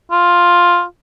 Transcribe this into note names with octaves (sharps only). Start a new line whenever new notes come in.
F4